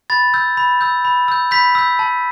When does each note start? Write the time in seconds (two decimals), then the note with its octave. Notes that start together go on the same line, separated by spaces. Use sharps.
0.10 B5 A6
0.34 E6 G6
0.57 B5
0.81 E6 G6
1.05 B5
1.28 E6 G6
1.51 B5 G6 B6
1.75 E6 G6
1.99 A5